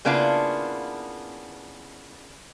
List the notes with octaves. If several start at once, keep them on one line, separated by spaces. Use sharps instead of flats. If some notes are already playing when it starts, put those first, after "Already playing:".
C#3 A#3 B3 D4 E4 F4